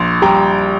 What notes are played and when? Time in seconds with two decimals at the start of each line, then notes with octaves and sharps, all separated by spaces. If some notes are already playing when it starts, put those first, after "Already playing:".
Already playing: A#1 C6
0.22 G3 G5 A#5